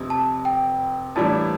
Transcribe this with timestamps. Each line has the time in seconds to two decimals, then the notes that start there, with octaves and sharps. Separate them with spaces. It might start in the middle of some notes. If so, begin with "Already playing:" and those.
Already playing: F1 F2 C3
0.10 A5
0.45 G5
1.15 A2 E3 G3 A#3 D4 A5